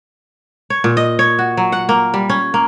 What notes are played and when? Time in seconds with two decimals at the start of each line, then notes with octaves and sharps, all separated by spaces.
0.70 C#5
0.84 A#2
0.97 D#5
1.19 C#5
1.39 F#4
1.57 F#3
1.72 F#5
1.89 A#3
2.14 G3
2.30 C#4
2.54 A#3